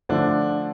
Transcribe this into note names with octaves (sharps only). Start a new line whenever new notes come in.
D3 F3 A3 D4